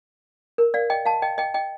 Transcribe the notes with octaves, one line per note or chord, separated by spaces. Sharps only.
A#4
D5 F5
D#5 G5
F5 A5
D#5 G5
D#5 G5
D#5 G5